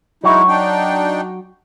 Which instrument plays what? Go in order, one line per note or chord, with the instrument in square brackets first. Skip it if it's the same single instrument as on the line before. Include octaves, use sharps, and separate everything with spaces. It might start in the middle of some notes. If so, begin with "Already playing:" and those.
[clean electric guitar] F#3 F#4 [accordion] G#3 D#4 E4
[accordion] D4 D#4 G5